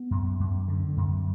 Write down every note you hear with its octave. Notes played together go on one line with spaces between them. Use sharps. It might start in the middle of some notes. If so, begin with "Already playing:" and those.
Already playing: B3
F#2
F#2
D3
F#2